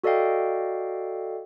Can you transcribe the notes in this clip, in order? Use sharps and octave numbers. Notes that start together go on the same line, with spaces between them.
F#4 A4 D5 D#5 F5 G5